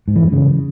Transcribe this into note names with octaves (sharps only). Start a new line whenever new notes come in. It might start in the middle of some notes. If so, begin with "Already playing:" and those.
G#2
E3
F#2
C#3